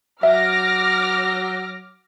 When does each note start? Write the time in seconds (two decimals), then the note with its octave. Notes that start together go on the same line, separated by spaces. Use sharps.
0.23 F#3 E5 D6 F6 A#6